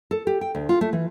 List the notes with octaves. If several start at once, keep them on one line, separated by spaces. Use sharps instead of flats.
A4
G4
G5
D2
F4
A3
E3